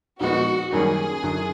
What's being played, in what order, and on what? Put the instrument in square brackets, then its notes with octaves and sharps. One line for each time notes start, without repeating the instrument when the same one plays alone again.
[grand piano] A#2 F3 G#3 B3 D#4 [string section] F#4
[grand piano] F#2 D#3 G3 A#3 C#4 [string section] G#4
[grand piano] F#1 F#2 D3